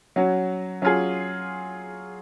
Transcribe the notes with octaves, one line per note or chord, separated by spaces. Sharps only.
F#3 C#4 F#4
F#3 C#4 F4 G#4